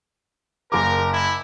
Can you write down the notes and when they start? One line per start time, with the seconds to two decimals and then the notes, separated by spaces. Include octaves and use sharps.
0.72 F#1 A#4 D6
1.11 E4